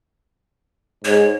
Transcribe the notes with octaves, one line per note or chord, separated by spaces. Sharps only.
G#2 C#5